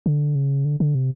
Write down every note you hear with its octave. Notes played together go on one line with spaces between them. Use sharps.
D3
C#3
D3
D3
C3